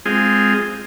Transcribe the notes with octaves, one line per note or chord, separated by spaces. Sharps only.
G#3 C4 F4 G#4